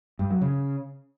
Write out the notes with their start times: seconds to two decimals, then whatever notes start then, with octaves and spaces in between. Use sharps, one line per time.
0.19 G2
0.30 F#3
0.41 C#3